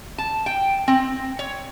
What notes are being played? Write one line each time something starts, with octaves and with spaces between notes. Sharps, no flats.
A5
G5
C4
C#5